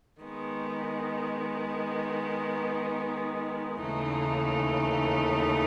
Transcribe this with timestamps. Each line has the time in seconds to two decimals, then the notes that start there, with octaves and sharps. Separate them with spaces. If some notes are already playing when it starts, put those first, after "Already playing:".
0.22 D#3 G#3 B3
3.80 D#2 C#3 E3 A3 D#4